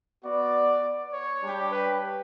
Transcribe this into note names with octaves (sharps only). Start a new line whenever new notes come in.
B3 F#4 D5
C#5
G3 D4 G4
B4